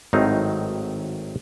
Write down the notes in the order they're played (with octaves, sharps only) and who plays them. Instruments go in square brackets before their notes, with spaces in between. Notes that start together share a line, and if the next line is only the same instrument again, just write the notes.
[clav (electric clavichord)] G#1 A2 D#3 F#3 C4 D#4